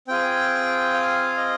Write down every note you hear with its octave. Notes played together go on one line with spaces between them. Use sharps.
C4 F4 G#4 G5
F5
D#5